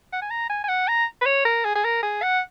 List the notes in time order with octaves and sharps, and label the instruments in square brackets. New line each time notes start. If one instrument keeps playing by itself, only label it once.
[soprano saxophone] F#5
G#5
A#5
G#5
G#5
F#5
A#5
B4
C#5
A#4
G#4
G#4
A#4
G#4
F#5